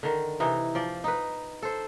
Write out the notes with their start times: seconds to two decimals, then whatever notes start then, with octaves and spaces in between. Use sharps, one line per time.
0.03 D3 D#3
0.40 C3 E3 D#4
0.75 F3 D5
1.04 D#4 B4
1.63 A4 C5